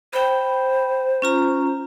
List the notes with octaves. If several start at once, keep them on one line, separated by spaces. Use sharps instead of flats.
C5 G5 B5
C#4 F4 A#5